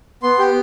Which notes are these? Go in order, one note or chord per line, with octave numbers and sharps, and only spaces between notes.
B3 C6
G4